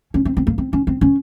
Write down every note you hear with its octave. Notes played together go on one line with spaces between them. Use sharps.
C#4
C4
C4
A#3
C4
C#4
C4
C#4